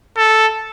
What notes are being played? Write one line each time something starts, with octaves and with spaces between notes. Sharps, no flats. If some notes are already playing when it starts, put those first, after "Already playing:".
A4